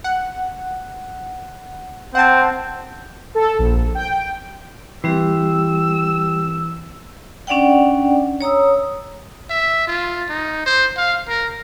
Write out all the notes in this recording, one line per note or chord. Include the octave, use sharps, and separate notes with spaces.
F#5
C4 F#5 A5
A4
A#1
G5
E3 G3 C4 G4 E6
C#4 D4 D5 F#5 G5
C#5 A#5 D#6 E6
E5
F4
D#4
C5
F5
A#4